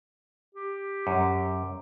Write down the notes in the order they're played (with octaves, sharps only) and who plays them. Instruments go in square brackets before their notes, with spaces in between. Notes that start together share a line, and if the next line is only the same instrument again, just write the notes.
[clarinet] G4
[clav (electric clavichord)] F#2